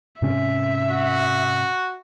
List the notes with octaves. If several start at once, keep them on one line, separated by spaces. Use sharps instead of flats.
G#2 C3 C#4 E5
F#4